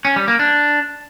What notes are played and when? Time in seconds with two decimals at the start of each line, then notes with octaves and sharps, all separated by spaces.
0.05 C#4
0.16 G3
0.28 A#3
0.39 D4